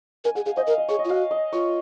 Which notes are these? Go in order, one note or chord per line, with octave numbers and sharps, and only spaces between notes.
A#4 G#5
G#4 F#5
G#4 F5
C5 D#5
A#4 F5
D#5
G#4 C#5
D#5
F4
F#4 F5
D#5
F4 C#5